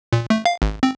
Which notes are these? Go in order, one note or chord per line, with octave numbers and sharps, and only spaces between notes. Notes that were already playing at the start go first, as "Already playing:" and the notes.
A#2
A3
F5
G#1
C4